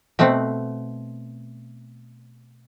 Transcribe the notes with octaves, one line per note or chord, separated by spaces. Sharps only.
B2 A3 B3 C4 F#5